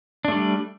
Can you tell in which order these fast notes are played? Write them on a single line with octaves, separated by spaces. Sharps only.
D4 A3 G3